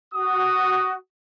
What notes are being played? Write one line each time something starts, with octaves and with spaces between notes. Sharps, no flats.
F#4 D#6